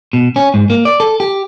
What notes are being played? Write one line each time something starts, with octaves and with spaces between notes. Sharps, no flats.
B2
C#4
G#2
A#3
D5
A4
G4